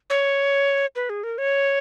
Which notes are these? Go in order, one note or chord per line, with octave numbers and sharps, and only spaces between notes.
C#5
B4
G#4
A#4
C#5